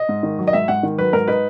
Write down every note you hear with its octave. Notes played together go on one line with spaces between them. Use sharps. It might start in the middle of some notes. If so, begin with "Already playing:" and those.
Already playing: D#5
G#2
D#3
F#3
D#5
G#2 E5
G#2 F#5
D#3
F#3 B4
G#2 A#4
D#4 B4